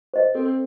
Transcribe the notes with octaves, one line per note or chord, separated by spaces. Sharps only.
C5 D#5
C4 A4